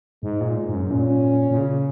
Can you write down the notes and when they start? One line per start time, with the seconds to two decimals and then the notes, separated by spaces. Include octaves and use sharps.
0.23 G#2 G#3
0.41 A#2
0.56 G#2
0.69 G#2
0.74 F#2
0.90 A#2 C#4
1.51 A#2
1.58 C#3